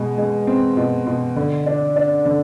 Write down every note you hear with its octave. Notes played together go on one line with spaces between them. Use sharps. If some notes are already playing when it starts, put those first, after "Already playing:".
Already playing: B2 G#3
G#3
C4
B2
B2
D3
D4
D4
D3